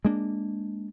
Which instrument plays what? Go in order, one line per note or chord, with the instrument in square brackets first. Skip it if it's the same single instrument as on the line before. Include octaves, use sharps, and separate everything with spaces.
[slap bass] G#3 A#3 D4